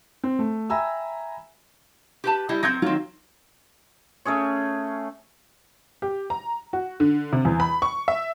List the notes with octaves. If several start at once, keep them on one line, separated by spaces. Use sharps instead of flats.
C4
A3
E5 G5 G#5 A#5 B5 E6
G4 B4 A5
G3 E4 D#5
F#3 C4 G6 G#6 A#6
D#3 F#3 C4 F4
A3 C#4 G#4 C#5
G4
A#5
F#4
D3
C3
E2
B5
C#6
E5